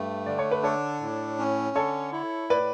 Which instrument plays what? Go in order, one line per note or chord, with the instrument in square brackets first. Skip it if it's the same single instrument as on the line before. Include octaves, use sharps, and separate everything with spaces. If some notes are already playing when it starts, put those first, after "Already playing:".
Already playing: [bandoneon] G2 A3
[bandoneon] D3 [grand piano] D5
[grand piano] C#5
B4
[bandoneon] D4 [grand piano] A4 C#5
[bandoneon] A2
C#4
[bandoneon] D3 [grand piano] A4 C#5
[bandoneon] E4
[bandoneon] A2 [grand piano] B4 D5